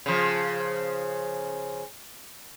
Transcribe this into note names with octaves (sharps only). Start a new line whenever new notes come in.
C#3 F3